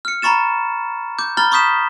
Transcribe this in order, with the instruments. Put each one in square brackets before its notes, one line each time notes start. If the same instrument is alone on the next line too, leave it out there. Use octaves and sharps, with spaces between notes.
[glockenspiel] F6 C#7
A#5 B5 C#6 A6 E7
D6 G6
A#5 B5 F6 A6 G7
B5 C#6 D#6 G6 B6 E7